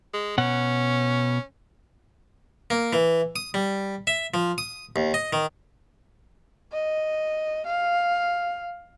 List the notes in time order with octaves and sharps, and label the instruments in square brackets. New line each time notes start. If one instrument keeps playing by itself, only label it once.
[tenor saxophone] G#3
[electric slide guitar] B2 F#5 [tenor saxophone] C#4
[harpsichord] A#3
E3
D#6
G3
E5
F3
D#6
D#2
D#5
D#3
[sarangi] D#5
F5